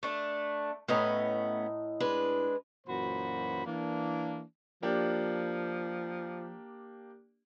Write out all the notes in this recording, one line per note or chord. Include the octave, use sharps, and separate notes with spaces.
A3 D4
A2 A3 B3 C#4 D#5 A#5
G#3 D4 B4
F#2 A#2 E3 F#4 C5 B5
E3 A#3 D4
F3 A#3 D4 G4